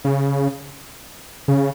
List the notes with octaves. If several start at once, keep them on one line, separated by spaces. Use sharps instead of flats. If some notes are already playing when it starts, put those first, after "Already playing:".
C#3
C#3